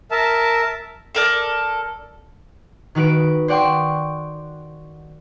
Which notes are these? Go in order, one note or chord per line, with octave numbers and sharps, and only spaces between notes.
A#4 E5 A5
A4 A#4 D5
D#3 D#4 F#4 B4 D7
C5 D5 F#5 G5 C6 C#6